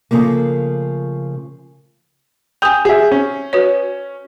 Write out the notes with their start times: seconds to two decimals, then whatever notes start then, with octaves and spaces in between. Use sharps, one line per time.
0.11 C#3 F3 A3 A#3
2.62 G5 G#5 D#6 G6
2.85 F#4 G#4 E5
3.11 C#4
3.53 F#4 B4 C#5